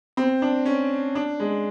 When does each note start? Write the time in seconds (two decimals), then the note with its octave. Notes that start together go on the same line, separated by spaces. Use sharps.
0.17 C4
0.42 D4
0.66 C#4
1.15 D4
1.40 G#3